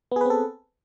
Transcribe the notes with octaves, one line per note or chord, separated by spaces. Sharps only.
B3 C4 G#4 A4 B4